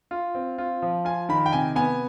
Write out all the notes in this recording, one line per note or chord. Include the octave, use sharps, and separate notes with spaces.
F4
C4
F4
F3
F4 G#5
D#3 B5
G5
C3 G#5
B3 G#5